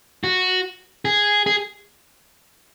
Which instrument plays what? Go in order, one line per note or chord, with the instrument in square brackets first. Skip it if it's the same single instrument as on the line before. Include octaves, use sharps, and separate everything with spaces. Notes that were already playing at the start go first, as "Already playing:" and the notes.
[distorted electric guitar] F#4
G#4
G#4